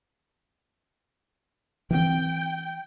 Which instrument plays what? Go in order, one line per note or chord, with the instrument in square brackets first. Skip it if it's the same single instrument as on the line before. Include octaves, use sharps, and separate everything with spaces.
[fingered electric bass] E3 C4 [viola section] G5